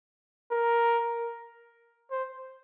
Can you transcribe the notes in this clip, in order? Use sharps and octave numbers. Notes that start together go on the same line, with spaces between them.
A#4
C5